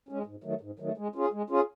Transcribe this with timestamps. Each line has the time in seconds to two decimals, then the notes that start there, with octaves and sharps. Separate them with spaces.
0.09 G#3 C#4
0.26 G#2
0.44 D#3 F#3 A3
0.61 G#2
0.79 D#3 F#3 A3
0.98 G#3
1.16 C#4 F4 G#4
1.32 G#3
1.50 C#4 F4 G#4